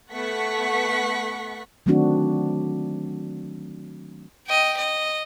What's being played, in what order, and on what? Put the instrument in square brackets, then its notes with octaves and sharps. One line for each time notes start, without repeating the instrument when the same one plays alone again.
[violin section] A3 B3 F#5 C#6 B6
[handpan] D#3 F#3 A3 C4 D4 F#4
[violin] D#5 G5
D#5